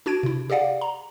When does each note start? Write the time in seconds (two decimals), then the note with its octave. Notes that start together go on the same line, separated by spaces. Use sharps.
0.06 D4 F#4 A5 G#6 D7
0.23 C3 E4
0.50 G4 G#4 D5 F5 F#5
0.81 A#5